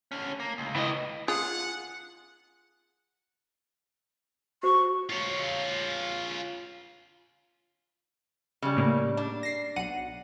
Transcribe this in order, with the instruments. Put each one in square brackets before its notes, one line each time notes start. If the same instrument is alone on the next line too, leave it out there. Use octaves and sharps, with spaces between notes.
[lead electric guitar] D3 C#4
A#3
C#2
[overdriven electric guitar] E3 D#5
[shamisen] F4 G#4 [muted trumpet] F#5
[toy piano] F#4 C5 [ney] C#6
[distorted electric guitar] F4 C#5
[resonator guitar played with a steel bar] C#3 G3
[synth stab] A2 A#3
[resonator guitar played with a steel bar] D4
[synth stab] A#6 C7
B1 F#5 D#7